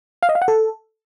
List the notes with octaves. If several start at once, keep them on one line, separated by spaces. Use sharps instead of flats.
F5
D#5
F5
F#5
A4